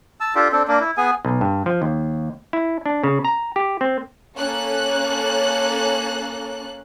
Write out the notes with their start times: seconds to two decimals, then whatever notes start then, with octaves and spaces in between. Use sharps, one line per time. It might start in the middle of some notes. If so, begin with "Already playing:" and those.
0.20 A5 E6
0.35 D4 F4 G4 A4
0.52 C4 D4 A4
0.68 A#3 D4
0.80 E4
0.97 B3 G#4 G#5
1.25 B1
1.41 G2
1.66 F3
1.82 D#2
2.53 E4
2.86 D4
3.04 C#3
3.25 A#5
3.56 G4
3.81 C4
4.37 A#3 C#4 A4 F#6